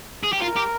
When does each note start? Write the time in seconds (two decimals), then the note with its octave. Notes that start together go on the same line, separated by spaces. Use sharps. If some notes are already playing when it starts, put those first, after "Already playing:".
0.23 G#4
0.33 G4
0.42 F4 A#4
0.57 G4